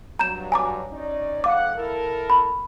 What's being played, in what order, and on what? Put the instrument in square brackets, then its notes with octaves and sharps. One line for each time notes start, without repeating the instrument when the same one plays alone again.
[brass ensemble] G2 F#3 [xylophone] A#5 G6 E7
[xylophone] G#5 A#5 D6
[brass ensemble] C#4 D#4 D5
[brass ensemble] F2 G#2 F#5 [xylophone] F5 D6
[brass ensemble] E4 A4 A#4
[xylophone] B5